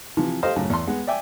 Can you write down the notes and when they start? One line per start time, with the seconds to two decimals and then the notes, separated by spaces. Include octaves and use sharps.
0.17 C3 E3 F3
0.43 G4 A4 C5 D#5 F5
0.56 F#2 A2 C#3
0.70 E2 C6
0.87 G#3 B3 F#5
1.07 D5 E5 G5 G#5